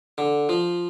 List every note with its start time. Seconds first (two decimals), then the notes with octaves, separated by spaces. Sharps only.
0.18 D3
0.49 F3